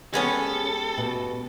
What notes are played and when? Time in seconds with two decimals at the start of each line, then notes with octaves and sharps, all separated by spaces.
0.14 G#3 B3 C#4 G4 A4
0.98 B2